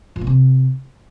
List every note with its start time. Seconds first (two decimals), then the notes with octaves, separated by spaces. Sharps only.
0.16 F3
0.21 A#2
0.27 C3